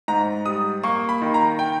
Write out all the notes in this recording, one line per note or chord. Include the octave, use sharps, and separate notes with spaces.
G#2 A#5
G3 D#6
A#3 C#6
B5
D#3
A#5
G5